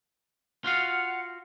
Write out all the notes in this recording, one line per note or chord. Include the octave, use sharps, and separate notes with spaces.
F4 F#4 F5 F#5